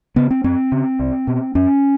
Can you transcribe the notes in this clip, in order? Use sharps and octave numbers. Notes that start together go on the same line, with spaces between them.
C#3 B3
C4
F#2 C4
C#3
C2
B2
F#2 C#4